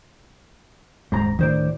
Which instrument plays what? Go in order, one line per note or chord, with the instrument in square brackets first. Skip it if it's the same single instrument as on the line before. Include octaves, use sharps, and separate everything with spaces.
[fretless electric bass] D#1 [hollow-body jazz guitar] G#2 C4 A#5
[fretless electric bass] D2 A2 [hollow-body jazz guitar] D#3 C5 D5